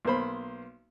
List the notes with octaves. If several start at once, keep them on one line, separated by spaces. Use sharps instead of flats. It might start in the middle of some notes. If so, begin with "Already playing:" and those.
B1 A#3 C5 B5